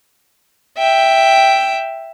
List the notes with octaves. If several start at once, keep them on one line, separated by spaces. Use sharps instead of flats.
E5 G5